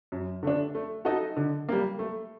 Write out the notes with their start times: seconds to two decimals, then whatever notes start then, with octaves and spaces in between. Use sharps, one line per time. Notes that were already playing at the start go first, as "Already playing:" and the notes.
0.12 F#2
0.43 D3 A3 D4
0.75 A3
1.05 D#4 F#4 A4 D#5
1.36 D3
1.69 G3 A#3
1.99 A3